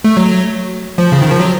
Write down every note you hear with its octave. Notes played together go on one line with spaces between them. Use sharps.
A3
F#3
F3
C#3
D#3
F3
F#3